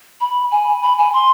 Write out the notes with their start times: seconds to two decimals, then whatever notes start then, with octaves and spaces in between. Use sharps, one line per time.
0.21 B5
0.52 G#5
0.83 B5
0.98 G#5
1.13 C6